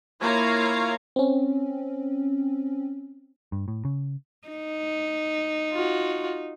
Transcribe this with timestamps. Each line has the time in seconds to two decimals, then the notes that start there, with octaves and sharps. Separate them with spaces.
0.21 A#3 E4 F4 C#5 F5 A#5
1.16 C4 C#4
3.52 G2
3.68 A2
3.85 C#3
4.48 D#4
5.72 F4 F#4